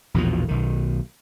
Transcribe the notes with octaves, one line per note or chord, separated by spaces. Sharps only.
A#1 E2 B2 F3
B1 D#3